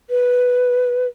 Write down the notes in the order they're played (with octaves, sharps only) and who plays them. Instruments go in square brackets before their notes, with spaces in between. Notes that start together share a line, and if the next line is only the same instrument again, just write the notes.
[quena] B4